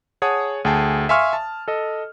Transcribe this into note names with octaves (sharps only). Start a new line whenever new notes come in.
G#4 C#5 F#5 A5 D#6
D2 G#4 G5 A5
E5 F5 G#5 C6 C#6 F6
A5
A4 D#5